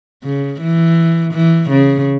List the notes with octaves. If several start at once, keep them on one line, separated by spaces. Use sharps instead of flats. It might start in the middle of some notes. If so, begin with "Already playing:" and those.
C#3
E3
E3
C#3